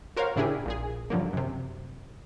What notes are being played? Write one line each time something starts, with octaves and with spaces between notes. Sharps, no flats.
F#4 A#4 C5 C#5 F5
A2 C#3 D4 E4 G4 G#4
A#1 A#2 G#4
G2 D3 F3 F#3 A#3
F#2 C3